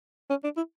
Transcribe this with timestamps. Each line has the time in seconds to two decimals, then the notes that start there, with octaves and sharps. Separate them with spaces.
0.30 C#4
0.44 D4
0.57 E4